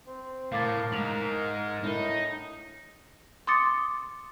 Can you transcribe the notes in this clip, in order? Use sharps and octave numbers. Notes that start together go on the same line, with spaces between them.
C4
A2 A#4 F5 D6 A6
G#2 F7 F#7
A2 D#4
C6 D6 D#6 A6 C#7